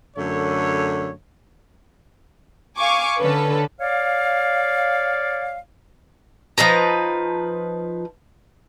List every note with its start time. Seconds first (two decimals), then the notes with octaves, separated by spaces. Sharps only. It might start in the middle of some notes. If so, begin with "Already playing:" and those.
0.17 F#2 D3 A3 C#5
2.77 F5 G#5 C#6 D6
3.18 D3 C#4 A4 B4
3.80 C#5 D5 F5
6.58 F3 D#4 B4 A#5